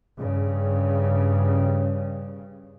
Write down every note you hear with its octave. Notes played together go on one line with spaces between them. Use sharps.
G2 C#3